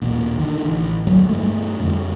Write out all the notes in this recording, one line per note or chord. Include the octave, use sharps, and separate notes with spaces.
A#1 D#2 A#2
D3 D#3
A1
D1 G1 D2 F#3
G2 G3 A3
F2 D3